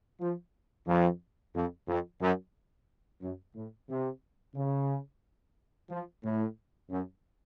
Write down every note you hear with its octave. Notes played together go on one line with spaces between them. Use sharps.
F3
F2
F2
F2
F#2
F#2
A2
C3
C#3
F3
A2
F#2